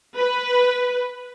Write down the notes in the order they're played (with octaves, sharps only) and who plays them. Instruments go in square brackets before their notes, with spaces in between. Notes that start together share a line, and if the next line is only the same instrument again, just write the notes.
[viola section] B4